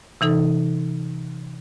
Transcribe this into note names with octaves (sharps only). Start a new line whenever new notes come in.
C3 E3 D#4 A4